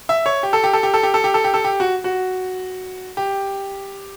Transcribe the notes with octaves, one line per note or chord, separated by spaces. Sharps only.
E5
C#5
G4
A4
G4
A4
G4
A4
G4
A4
G4
A4
G4
A4
G4
F#4
F#4
G4